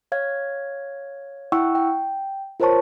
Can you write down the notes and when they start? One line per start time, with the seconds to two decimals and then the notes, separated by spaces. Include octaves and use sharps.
0.12 C#5 F5 G#6
1.52 E4 F#5 G5 C#6 E6
1.75 G5
2.60 F4 A#4 C5 C#5 A5 C#6